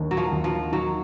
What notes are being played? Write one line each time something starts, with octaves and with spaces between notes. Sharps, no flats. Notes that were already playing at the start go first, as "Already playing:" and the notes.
Already playing: D#2 D4
F#3
F3
D#2
F3
D#3 F#3